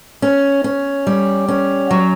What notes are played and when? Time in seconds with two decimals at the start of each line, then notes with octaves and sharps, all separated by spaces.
0.22 C#4
0.64 C#4
1.07 G3
1.48 C#4
1.91 F#3